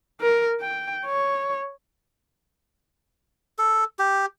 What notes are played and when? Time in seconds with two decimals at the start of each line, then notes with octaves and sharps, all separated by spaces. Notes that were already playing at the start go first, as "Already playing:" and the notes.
0.21 A#4
0.61 G5
1.06 C#5
3.58 A4
3.99 G4